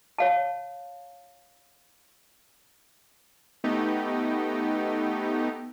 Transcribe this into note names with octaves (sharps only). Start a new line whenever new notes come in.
C#5 F5 A5
A3 B3 D#4 G4